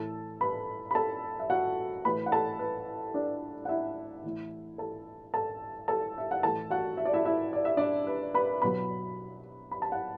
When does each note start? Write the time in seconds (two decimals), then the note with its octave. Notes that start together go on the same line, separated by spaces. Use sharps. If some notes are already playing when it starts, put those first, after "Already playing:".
Already playing: A2 E3 A4 A5
0.41 B4 B5
0.91 B5
0.95 A4 A5
1.39 E5
1.50 F#4 F#5
2.05 A2 E3 B4 B5
2.26 F#5
2.32 A4 A5
2.59 B4
3.14 D4 D5
3.65 F#5
3.69 E4 E5
4.23 A2 E3
4.78 A4 A5
5.34 A4 A5
5.88 A4 A5
6.18 E5
6.31 F#5
6.43 A2 E3 A4 A5
6.70 F#4 F#5
6.97 E5
7.05 D5
7.13 E4 E5
7.25 E4 E5
7.53 D5
7.65 E5
7.77 D4 D5
8.07 B4
8.34 B4 B5
8.62 B2 F#3 B4 B5
9.71 B5
9.82 A5
9.92 F#5